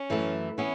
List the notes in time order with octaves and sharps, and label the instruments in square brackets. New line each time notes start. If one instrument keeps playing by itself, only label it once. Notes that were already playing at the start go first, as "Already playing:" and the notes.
Already playing: [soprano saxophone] C#4
[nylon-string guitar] F#2 E3 A3
[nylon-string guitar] E3 B3 [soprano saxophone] C#4